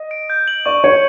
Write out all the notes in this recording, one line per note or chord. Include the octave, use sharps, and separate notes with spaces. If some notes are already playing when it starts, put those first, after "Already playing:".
Already playing: D#5
D7
G6
F#7
D5 C#6
C#5 C#7